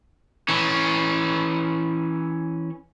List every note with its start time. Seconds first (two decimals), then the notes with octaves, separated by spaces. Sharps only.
0.48 E3 C#4